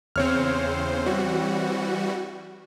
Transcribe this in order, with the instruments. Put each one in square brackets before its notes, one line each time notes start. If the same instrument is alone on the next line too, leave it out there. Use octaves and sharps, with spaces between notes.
[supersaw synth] E2 C#3 C5 [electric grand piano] C4 C#5 F6
[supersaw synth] E3 G3 F#4